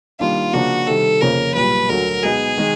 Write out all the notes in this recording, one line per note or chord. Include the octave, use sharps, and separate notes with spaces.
D#3 G3 A#3 D4 F4
C#3 F3 A#3 D4 F#4
C3 D#3 G3 A4
F2 C#3 F3 A#3 C#4 A#4
B1 A#2 G3 B4
D2 D3 F#3 A#4
B2 G#3 B3 D#4 G#4
D#3 G#3